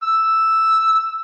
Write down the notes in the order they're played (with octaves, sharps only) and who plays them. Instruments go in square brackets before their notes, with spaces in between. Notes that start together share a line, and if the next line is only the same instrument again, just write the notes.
[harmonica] E6